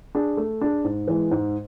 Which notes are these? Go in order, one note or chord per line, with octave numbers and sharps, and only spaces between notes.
D4 G#4
A3
D4 G#4
G#2
E3 G#3
G#2